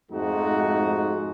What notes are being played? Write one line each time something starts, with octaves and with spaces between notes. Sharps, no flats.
F2 G#2 G#3 A3 D#4 F#4